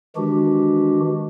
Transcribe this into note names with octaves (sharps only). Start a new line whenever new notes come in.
D#3 E3 G#3 D4 F#4 G4